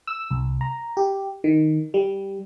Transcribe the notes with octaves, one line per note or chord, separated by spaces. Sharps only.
E6
C2
A#5
G4
D#3
G3